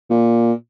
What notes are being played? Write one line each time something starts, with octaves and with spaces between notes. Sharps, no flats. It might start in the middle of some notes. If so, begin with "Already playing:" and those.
A#2